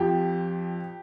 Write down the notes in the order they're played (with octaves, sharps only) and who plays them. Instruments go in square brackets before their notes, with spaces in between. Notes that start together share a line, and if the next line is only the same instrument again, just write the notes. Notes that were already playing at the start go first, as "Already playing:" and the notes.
Already playing: [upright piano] F2 F3 G4